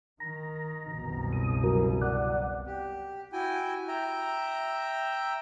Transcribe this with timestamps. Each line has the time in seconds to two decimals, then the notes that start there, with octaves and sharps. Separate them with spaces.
0.20 D#3 A#5
0.94 F#1 C2 B2
1.33 D#6
1.64 F#3 A#4
2.02 D5 F#5
2.67 G4
3.33 E4 F#4 G5 G#5
3.88 E5 G5 A#5